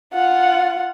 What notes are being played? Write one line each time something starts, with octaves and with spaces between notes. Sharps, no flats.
F4 F#5